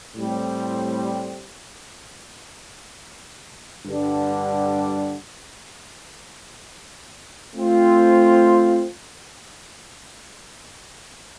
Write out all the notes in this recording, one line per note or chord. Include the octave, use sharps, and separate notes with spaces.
A2 G3 C4
G2 D3 G3 D4
A3 C4 F4